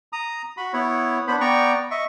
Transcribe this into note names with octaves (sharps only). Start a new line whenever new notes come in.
A#5 D#6
F#4 B5
B3 E4 C#5
B3 D4 B4 C5 B5
B3 D5 G5 A#5 C#6
D#5 E5 C#6